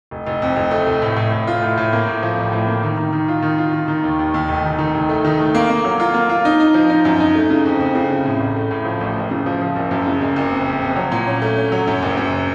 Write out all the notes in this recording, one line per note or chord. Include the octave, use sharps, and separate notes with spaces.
F1
F1
F2
F1
A3
F1
A2
A2
A2
F4
A2
A2
A#3
A2
F3
A1
A2
A#3
D#3
D#3
D#3
F4
D#3
F4
D#3
D#3
D#2
D#2
D#2
F1
D#3
D#3
F1
A3
D#3
A3
A#3
A#3
F#3
F4
A#3
F4
D#4
D#4
F3
D#4
F#2
D#4
A3
C#3
F2
F2
C#3
C#3
A2
A1
A3
A2
F3
A1
F#1
C#3
F3
F3
F#1
F#2
C#3
F#1
F#1
F2
F2
F2
F#3
A#2
C#4
A3
C#4
F#3
F#2
F#1
F#2